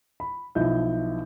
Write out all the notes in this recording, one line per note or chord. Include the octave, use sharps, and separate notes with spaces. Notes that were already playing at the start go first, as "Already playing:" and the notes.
B5
B1 F3 E4 D#5 G6